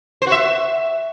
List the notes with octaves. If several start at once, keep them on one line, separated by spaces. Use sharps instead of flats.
C5
F#4
E5